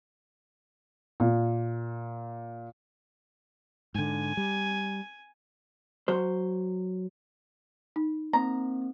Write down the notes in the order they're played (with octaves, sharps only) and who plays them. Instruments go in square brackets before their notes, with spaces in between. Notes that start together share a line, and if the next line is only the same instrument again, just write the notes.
[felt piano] A#2
[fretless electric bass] G#2 D3 [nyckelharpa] G#5
[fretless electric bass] G3
[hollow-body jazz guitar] F#3 C5
[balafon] D#4
[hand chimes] A#3 C4 [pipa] A#5